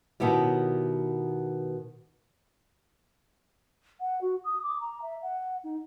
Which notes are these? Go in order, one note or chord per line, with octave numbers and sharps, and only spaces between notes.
B2 D#3 B3 C#4 E4 G4
F#5
F#4
D#6
D6
A#5
E5
F#5
D#4